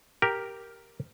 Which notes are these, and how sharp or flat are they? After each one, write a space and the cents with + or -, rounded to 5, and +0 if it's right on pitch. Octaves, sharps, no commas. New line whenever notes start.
G4 +0 A#4 +0